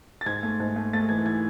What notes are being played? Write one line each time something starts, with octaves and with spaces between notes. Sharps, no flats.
A6
G#2 G#6
A3
G#2
A3
A3 A6
E3 G#6
E3 G#6